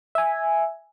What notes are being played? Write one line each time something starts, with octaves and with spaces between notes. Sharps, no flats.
E5 G#5